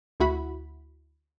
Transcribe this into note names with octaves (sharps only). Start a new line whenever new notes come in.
D2 E4 F#4 B5